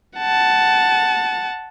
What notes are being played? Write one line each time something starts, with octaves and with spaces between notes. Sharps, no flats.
F#5 A5